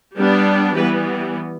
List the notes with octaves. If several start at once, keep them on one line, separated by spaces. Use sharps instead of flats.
G3 B3 D4
E3 G3 B3 G4 B4